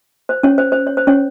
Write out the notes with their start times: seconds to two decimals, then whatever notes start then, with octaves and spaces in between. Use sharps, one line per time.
0.29 C5
0.43 C#4 C#5
0.58 C5
0.72 C5
0.87 C#5
0.97 C5
1.07 C#4 C#5